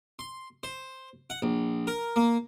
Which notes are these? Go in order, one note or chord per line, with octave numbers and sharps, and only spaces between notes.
C6
C5
F#5
A#1
A#4
A#3